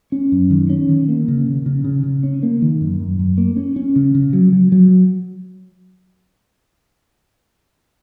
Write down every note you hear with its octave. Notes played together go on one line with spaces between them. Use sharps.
C#4
F#2
D#3
C#4
D#3
A#3
C#3
C#3
C#3
C#3
C#3
C#4
A#3
D#3
F#2
F#2
F#2
A#3
C#4
C#4
C#3
C#3
F#3
F#3
F#3